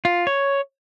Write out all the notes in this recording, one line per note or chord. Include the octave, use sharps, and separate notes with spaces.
F4
C#5